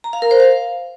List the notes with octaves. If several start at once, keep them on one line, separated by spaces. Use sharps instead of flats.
A#5
F5
A#4
C5
F5